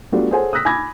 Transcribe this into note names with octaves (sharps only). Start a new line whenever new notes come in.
G3 A3 B3 D4 F4 F#4
G#4 A4 C5 C#5 F#5 G#5
D#6 E6 F#6 A#6 B6
G#5 B5 D6 E6 G#6 A#6